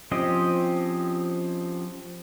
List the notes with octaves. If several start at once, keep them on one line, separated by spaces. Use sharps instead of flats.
F3 C4 C#4 G4 D#5